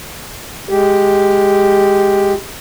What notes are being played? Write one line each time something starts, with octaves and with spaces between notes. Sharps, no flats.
G#3 G4